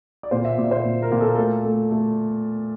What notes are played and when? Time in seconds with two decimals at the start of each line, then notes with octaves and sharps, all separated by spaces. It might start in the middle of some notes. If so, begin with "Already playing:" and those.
0.23 D5
0.31 A#2 C5
0.45 E5
0.58 A#2 D5
0.71 C5
0.84 A#2
1.02 A#4
1.12 A#2
1.21 A4
1.27 A#4
1.35 A3 A4
1.64 A3
1.91 A3